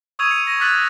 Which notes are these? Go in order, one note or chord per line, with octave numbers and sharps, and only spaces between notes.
C#6 D#6 E6 G#6 D#7 F7
C#7
A#6
D6 F6 F#6 A6 B6 F#7